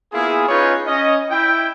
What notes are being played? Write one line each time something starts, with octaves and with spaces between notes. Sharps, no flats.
A#3 B3 E4 F4 G#4
C#4 D#4 F4 G#4 B4 C#5
C#4 D#5
E4 G5